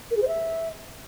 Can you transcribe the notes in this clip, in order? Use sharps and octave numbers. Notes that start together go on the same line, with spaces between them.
A#4
G#4
C5
E5